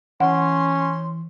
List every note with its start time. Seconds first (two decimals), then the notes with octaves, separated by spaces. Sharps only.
0.20 E3 C#4 F#5 C6